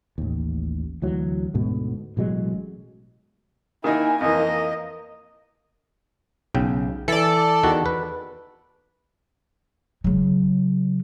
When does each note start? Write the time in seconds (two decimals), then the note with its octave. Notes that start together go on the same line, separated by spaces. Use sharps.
0.18 A1 D#2
1.02 D2 E3 F#3
1.54 D2 G#2 B2
2.17 A1 B2 F#3 G#3
3.84 D#3 A#3 D#4 E4 G#5
4.21 F2 E3 A#3 D#5
6.55 B1 C#3 G5
7.08 E3 A4 D5
7.63 E2 D#3 F#4
7.86 B4
10.04 C#3 F#3